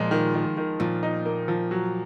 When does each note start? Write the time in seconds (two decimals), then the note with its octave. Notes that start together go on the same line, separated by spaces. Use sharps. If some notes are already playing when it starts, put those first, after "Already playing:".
Already playing: A#2 F3 G#3
0.11 D#3
0.34 D#3
0.57 D#3
0.80 A#2 F3
1.03 D#4
1.26 A#3
1.48 F3
1.71 F#3